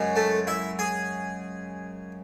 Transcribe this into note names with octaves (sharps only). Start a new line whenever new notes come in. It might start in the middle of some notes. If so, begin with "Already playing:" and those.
Already playing: F#2 C#3 G#3
A3 A4
E4 E5
G#4 G#5